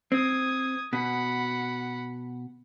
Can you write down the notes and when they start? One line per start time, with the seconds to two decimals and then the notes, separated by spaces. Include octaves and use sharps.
0.12 C4 D#6 G#6
0.93 B2 F#5 B5